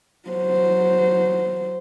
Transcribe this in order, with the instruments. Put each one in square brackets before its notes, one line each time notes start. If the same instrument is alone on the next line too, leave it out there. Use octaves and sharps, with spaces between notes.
[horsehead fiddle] F#3 C5